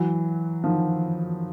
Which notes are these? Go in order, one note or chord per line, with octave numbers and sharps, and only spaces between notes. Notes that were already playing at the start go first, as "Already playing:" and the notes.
Already playing: E3 F#3
D#3 F3